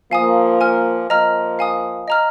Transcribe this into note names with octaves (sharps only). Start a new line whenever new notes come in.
F3 A#3 F5 G#5 D#6
A#4 G#5 F6
F3 A#3 D#5 A#5 F6
F5 G#5 D#6
D#5 A#5 F6